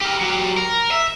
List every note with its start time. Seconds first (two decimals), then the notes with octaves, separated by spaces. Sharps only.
0.01 G4 A#4
0.20 F#3 G4
0.57 A#4
0.91 E5